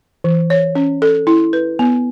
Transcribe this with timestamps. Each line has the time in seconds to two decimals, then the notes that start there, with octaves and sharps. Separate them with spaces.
0.24 E3
0.50 C#5
0.75 C#4
1.02 A4
1.27 E4
1.53 B4
1.79 B3